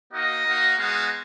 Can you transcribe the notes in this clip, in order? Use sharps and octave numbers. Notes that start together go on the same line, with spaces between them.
A#3 D#4 F#4 D#5
A#3 D#4 F#4
G#3 B3 D#4 F#4 F5